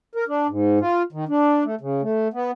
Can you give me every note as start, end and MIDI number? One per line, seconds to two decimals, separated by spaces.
0.15 0.24 70
0.28 0.47 62
0.49 0.79 44
0.81 1.02 65
1.12 1.25 51
1.29 1.64 62
1.64 1.75 57
1.81 2.02 49
2.02 2.28 57
2.34 2.51 59